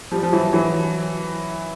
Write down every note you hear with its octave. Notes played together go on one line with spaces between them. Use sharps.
F3 G3
F3
E3 F#3
E3 F#3